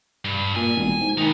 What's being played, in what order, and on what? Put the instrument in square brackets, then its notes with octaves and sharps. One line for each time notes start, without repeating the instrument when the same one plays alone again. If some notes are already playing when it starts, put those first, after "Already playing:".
[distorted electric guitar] G2
[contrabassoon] A#2 [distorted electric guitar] G#5
[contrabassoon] E1
G#2
[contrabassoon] D#3 [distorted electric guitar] B3 D#4